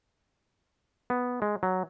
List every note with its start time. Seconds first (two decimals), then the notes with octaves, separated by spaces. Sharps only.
1.10 B3
1.42 G#3
1.63 F#3